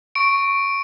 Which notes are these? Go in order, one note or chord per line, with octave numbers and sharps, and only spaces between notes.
C#6 D7